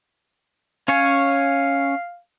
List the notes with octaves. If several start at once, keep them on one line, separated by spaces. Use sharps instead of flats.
C#4 C#5 F5 G#5